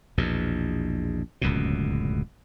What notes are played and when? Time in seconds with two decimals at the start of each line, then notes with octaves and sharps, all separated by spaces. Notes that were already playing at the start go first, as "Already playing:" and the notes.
0.18 A#1 E2 B2
1.41 D1 C#2 F#2 B2